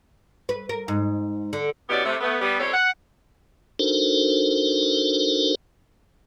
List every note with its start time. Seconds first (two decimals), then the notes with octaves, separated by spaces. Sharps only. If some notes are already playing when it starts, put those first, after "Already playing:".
0.49 B4
0.69 A#4
0.88 G#2
1.53 D3
1.89 B2 B3 C#4 E4 G4 D5
2.05 C3 A3
2.20 A3 B3
2.41 G3 B3
2.60 F2 G3 C4 A4 C#5
2.74 F#5
3.79 D4 D#4 F#4 A4 A#4 C5